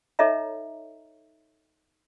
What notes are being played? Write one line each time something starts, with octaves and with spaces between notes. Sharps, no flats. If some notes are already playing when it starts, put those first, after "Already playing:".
D#4 A4 C#5 D#5 E5 A#5